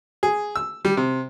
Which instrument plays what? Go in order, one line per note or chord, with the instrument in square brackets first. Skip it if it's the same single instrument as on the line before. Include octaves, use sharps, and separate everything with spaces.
[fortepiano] G#4
E6
G3
C3